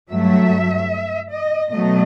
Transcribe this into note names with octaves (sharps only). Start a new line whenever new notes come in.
G2 F#3 A3 E5
D#5
B2 F#3 A3 D#5